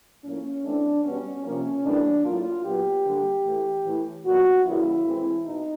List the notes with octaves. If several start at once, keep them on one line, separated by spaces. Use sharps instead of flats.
A2 F3 A#3 C#4
E3 A3 C4 D4
B2 G3 B3 C#4
C3 F3 A#3 C#4
A2 E3 G3 A#3 D4
A2 F#3 A#3 F4
A#2 F#3 B3 G4
D3 G3 A#3
A2 E3 A3
A2 E3 A3
A#2 F#3 B3 F#4
C#3 E3 G3 A#3 E4
A2 E3 G#3 C4
B2 D#4